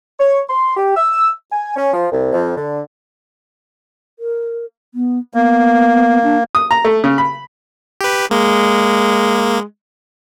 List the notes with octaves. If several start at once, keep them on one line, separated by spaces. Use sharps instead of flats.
C#5
C6
G4
E6
G#5
C#4
F3
C2
F2
D3
A#4
B3
A#3 B3
D4
D#6
A#5
A3
C#3
B5
G4 B4
G#3 A#3